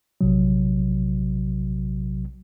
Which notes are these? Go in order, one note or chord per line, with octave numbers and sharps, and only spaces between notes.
A#1 C3 F#3